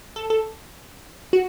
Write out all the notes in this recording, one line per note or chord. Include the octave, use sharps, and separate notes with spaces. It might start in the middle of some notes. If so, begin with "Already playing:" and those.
A4
A4
F#4